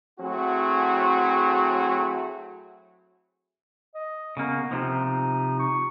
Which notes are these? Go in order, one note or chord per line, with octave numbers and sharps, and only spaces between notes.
F#3 A3 C4 E4 F#4 G#4
D#5
C#3 A#3 B3
C3 F3 D#4
C#6